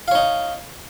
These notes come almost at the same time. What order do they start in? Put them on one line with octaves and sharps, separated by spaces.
F5 C#5 D#4